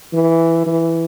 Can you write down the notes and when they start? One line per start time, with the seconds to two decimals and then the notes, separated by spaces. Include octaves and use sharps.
0.13 E3
0.66 E3